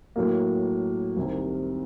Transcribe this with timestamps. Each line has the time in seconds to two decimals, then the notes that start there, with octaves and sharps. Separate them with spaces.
0.16 A2 F#3 A#3
1.17 C2 C3 D#3